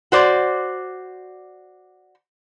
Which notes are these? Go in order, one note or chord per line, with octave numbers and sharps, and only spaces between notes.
F#4 C5 D5